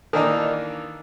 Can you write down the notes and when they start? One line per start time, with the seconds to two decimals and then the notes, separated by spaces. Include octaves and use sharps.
0.13 D#3 E3 A#3 D4 D#4